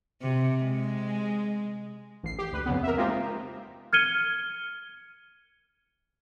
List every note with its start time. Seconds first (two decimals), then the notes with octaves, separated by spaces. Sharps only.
0.22 C3
0.63 G#3
2.23 A1 C7
2.39 G4
2.52 D2 B4
2.66 F2 C#3 B3
2.83 A#4 E5
2.97 G#3 A#3 C4 D#4 F4 G4
3.93 F6 G#6 C#7 D#7 G7